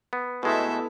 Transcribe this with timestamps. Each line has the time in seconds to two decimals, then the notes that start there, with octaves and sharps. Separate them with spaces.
0.13 B3
0.43 B2 G#3 A3 B3 E4 A4 E5